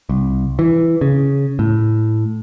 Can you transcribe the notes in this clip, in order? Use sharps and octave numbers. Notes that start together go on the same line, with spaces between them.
C2
E3
C#3
A2